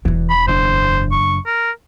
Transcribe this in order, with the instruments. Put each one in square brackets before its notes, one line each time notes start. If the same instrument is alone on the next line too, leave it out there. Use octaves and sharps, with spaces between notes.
[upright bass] E1 E2 [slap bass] E3
[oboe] B5
[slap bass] F#1 C#4 D4 [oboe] C5
[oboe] C#6
A#4